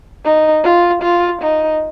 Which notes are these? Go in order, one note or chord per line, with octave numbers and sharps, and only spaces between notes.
D#4
F4
F4
D#4